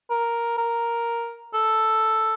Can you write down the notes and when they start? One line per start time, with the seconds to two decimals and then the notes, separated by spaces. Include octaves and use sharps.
0.10 A#4
0.58 A#4
1.54 A4